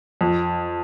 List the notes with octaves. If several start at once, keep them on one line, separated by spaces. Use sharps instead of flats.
F2